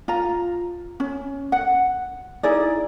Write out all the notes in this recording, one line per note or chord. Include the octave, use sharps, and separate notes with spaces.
F4 F5 A#5
C#4
F#5
D#4 E4 G#4 D5